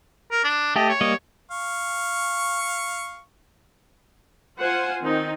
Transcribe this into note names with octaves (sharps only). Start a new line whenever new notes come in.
A#4
D4
A3 G4 A4 D#5
C#5
G3 A#3 D#5
F5 C#6
F4 C5 F#5 G#5
D#3 C4 D#4